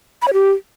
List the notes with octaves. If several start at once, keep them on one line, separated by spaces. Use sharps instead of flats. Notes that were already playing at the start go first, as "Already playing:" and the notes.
B5
C#5
G4